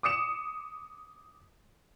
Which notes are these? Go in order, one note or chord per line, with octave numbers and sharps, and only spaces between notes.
D6 D#6 C#7 E7